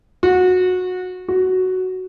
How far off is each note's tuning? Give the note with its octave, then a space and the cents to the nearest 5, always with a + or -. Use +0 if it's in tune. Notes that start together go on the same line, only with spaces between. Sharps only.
F#4 -20
F#4 +5